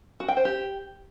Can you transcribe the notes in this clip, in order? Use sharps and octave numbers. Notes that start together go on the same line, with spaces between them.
F#4
G5
C5
G4